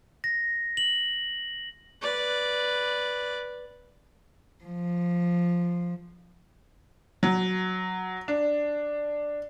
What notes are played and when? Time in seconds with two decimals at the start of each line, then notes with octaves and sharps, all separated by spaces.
0.24 A#6
0.77 F#7
2.02 B4 D5
4.65 F3
7.23 F#3
8.28 D4